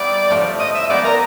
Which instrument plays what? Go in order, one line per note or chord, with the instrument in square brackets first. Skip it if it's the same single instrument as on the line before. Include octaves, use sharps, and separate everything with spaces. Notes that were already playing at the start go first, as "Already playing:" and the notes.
Already playing: [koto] G3 B3 E4 G4 [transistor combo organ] D5
[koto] A2 F3 A3
[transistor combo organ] D#5
E5
[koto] F3 G#3 B3 D#4 [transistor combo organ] D5
[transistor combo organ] A#4